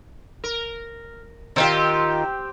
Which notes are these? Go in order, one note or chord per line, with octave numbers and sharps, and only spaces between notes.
A#4
D#3 C4 D#4 F4 G4